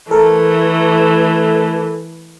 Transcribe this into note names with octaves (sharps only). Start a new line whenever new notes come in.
E3 A3 A4 A#4